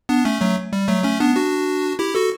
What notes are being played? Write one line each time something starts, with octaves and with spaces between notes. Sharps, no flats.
B3 D4
A3 C#4
F#3 A3
G3
F#3 A3
A3 C#4
B3 D4
D4 F#4
E4 G4
F#4 A4